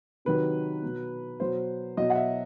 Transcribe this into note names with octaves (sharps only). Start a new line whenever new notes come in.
C3 D#3 F#3 B4
B2 F#3
B2 F#3 C5
B2 F#3 D#5
F#5
E5